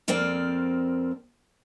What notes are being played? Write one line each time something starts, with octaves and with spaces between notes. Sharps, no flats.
F2 A#3 C4 A#4 D5 G5